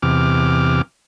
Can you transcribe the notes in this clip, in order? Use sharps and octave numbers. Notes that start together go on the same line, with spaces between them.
E2 C3 D6 F6